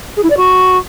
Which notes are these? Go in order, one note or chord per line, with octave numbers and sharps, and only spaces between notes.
G#4
E4
D5
F#4